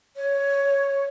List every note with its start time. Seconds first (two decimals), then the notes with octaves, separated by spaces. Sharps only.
0.16 C#5